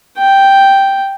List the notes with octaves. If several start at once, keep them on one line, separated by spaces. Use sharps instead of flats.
G5